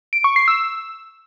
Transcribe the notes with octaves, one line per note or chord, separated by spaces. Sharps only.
D7
C#6
C7
E6